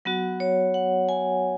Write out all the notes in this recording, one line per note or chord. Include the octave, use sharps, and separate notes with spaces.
F#3 B3 F#4 F#5
C#5
F#5
G#5